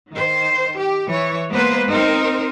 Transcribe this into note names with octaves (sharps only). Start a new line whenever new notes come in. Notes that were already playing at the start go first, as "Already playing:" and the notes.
D#3 C5
G4
E3 C#5
G#3 A#3 B3 B4 C5
C4 D#4 A#4 C5